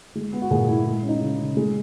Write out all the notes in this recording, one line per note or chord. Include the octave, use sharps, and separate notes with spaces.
G#3
B3
F#4
A#2 G#4
A#2 E4
G#3 E4
C#4
D#4
C#3
C#3
G#3